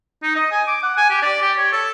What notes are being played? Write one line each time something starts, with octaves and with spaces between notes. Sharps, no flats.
D#4
D#5
G#5
D6
F#5
G#5
G4
D5
G4
C#5
A4